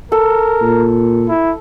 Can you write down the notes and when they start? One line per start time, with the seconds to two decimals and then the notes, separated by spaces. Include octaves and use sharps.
0.12 A4 A#4
0.62 A#2
1.29 E4